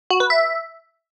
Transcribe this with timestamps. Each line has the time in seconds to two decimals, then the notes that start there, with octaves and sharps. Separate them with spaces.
0.10 F#4
0.20 B4
0.30 E5